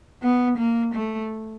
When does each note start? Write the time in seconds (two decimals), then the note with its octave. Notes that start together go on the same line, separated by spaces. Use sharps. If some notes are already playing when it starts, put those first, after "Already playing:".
0.23 B3
0.57 A#3
0.94 A3